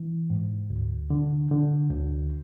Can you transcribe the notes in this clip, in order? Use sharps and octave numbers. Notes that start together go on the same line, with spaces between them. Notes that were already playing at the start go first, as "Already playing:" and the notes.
Already playing: E3
G#2
D2
D3
D3
D2